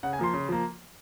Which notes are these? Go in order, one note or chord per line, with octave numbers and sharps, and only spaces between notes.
C#3 F#5
G#5
F3 A#3 C6
C#3
F3 A#3